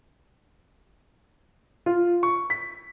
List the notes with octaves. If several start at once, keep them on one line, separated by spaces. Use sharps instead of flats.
F4
C#6
B6